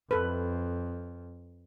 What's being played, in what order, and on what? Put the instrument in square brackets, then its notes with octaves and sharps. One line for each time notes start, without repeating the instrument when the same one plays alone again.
[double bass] F2 [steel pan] A4 B4